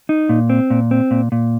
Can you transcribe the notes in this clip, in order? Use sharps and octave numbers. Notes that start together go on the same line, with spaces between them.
D#4
A#2
C4
A#2
C4
A#2
A#2